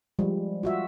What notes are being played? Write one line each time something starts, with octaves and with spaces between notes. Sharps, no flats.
F3 G3 G#3
F4 F#4 E5